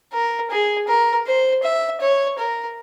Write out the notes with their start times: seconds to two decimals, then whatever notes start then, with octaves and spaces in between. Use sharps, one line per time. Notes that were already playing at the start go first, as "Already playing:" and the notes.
0.13 A#4
0.51 G#4
0.88 A#4
1.26 C5
1.63 E5
2.01 C#5
2.39 A#4